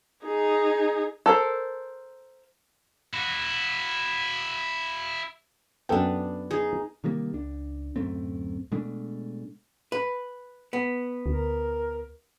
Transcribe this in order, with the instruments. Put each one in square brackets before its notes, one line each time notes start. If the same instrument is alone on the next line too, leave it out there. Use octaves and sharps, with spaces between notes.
[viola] D#4 G#4
[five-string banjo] A4 A#4 C5
[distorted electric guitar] E4 F#4
[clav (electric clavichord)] F#2 A4 G5 [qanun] B3 D4
[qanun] D#4 G#4
[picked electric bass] C3 D#3 G3 A#3
C#2 D4
D1 F#2 A3 C4
B2 G#3 A3 D4
[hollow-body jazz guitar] B4
B3
[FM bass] D2 [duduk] A#4